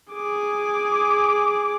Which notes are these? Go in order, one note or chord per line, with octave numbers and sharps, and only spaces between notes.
G#4 D6